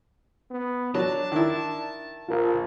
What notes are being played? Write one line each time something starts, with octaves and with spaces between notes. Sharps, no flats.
B3
F#3 D4 A5
D#3 E4
A#1 F4 A#4 F5